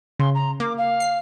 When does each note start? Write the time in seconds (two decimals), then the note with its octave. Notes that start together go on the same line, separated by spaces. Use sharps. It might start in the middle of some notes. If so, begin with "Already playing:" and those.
0.20 C#3 C6
0.35 A#5
0.60 A#3 D6
0.78 F5
1.00 C7